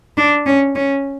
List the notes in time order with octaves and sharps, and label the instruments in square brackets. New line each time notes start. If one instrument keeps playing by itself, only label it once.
[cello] D4
C#4
C#4